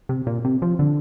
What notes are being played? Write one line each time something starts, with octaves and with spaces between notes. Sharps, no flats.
C3
A#2
C3
F3
D3